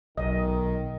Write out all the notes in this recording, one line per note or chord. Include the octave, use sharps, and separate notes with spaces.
B1 D#3 D#5